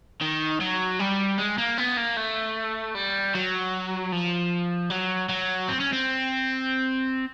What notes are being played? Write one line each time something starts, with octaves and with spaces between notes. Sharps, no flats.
D#3
F#3
G3
G#3
A#3
B3
A#3
A3
G3
F#3
F3
F#3
F#3
C4
C#4
C4